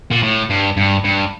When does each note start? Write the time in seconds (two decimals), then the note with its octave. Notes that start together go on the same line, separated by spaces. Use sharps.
0.11 A#2
0.23 A2
0.50 G2
0.77 G2
1.04 G2